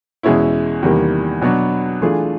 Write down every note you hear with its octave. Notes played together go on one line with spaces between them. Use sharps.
E2 B2 G#3 C#4 E4
E2 C3 D#3 G3 A#3
B2 F#3 B3 D4 F#4
E3 A3 D4 F4 G#4